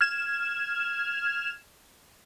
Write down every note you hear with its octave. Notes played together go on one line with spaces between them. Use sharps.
F6 G#6 E7